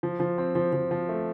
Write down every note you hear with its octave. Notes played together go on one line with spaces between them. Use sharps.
F3
F3
C4
F3
F3
F3
A3